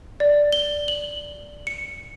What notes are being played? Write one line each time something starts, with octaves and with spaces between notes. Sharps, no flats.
D5
G7
F#7
C#7